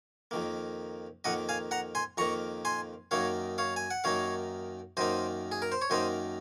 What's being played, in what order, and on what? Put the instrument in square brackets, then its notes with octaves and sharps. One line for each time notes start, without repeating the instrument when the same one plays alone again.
[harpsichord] F2 D#3 A#3
F2 D#3 A#3 D#5 F#5
F5 G#5
F#5 A#5
G#5 C6
F2 D#3 A#3 A#5 C#6
G#5 C6
F#2 D#3 A#3 D#4 C#5 F5
C#5 F5
G#5
F#5
F#2 D#3 A#3 D#4 C#5 F5
F#2 D#3 A#3 D#4 C5 D#5
G#4
A#4
C5
C#5
F#2 D#3 A#3 D#4 C5 D#5